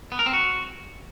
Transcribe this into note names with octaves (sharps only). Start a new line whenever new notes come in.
B3
A#4
C4
F#4